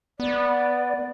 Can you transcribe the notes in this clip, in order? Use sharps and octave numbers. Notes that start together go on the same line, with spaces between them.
B3 D5